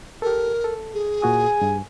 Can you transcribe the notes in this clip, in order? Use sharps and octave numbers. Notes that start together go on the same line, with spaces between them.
G4 A4 A#4
A4
G#4
A#2 F#4 G#5 D#6
G2